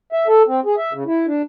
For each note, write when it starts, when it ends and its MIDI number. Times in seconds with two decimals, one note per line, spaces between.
0.13 0.27 76
0.27 0.43 69
0.47 0.60 60
0.66 0.75 68
0.78 0.93 76
0.93 1.04 49
1.06 1.26 64
1.27 1.42 62